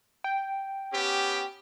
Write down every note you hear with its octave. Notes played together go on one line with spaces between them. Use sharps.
G5
B3 C#4 G4